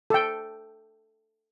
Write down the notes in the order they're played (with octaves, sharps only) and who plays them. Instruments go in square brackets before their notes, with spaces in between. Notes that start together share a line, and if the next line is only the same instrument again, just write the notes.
[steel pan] A4 G5